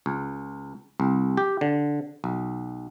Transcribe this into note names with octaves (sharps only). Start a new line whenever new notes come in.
C#2
C2
G4
D3
B1